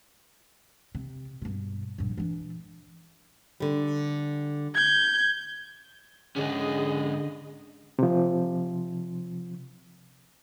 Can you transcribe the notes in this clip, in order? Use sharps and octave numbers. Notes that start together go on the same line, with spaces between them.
C3
G2 B2
A#1 G2
E3 D4
D3 G3
G6 G#6
G#2 D3 C#4 G#4 D#5
C3 F3